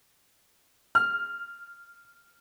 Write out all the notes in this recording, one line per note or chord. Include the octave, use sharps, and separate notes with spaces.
F6